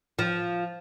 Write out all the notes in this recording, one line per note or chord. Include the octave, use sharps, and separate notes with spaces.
F3